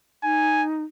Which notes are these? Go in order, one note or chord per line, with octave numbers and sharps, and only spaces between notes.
D#4 G#5